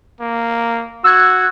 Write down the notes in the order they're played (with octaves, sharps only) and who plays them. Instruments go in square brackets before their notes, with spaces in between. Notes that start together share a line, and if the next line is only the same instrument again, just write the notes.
[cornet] A#3
[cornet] F#4 [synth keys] E6 F#6 G#6